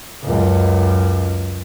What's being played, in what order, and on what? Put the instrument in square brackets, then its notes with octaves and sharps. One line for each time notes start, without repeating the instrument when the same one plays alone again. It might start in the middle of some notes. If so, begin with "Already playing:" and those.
[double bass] C#2 F#2